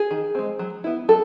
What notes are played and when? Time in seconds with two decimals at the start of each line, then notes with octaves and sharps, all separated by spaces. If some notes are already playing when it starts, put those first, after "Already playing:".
Already playing: G#4
0.11 D#3
0.35 G#3 C4
0.59 F#3
0.84 B3 E4
1.09 F#3 A4